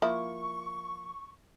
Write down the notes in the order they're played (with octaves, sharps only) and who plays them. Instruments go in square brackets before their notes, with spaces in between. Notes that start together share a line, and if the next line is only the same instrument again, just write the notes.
[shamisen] F3 A#3 E4 [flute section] C#6